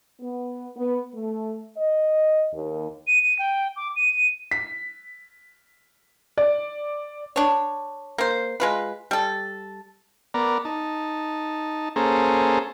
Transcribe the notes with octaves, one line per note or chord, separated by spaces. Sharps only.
B3
B3
A3
D#5
D#2
D#7
D#7
G5
D6
D#7
B6
D5
D4 C#5
A#3 C5
G#3 F4 B4
G3 A4
B3 A#4 D5 A#5
D#4 A5
A#3 C#4 G#4 A4 C5 A#5